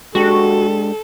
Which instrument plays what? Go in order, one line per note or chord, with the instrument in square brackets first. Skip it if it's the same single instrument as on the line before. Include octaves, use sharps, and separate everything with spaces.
[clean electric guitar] G#3 D4 G4 [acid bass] F#4 [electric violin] A4